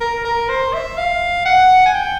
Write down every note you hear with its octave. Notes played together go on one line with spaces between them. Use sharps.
A#4
A#4
C5
E5
F5
F#5
G#5
G5